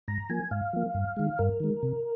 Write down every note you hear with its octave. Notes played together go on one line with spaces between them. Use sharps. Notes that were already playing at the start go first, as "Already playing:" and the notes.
G#2 A#5
F3 A#3 G#5
G#2 F5
F3 A#3
G2
D#3 G#3
G2 A#4
D#3 G#3
C3